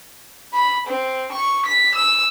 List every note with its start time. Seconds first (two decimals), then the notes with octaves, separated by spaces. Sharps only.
0.53 B5
0.87 C4
1.32 C#6
1.66 B6
1.95 E6